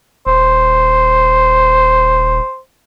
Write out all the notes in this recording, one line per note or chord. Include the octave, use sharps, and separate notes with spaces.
D#1 C5